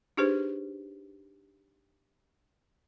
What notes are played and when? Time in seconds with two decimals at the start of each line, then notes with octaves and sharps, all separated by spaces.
0.17 D4 D#4 G4 G#4 B4 C5